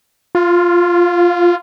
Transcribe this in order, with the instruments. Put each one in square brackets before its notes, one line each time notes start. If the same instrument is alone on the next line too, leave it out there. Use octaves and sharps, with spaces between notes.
[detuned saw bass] F4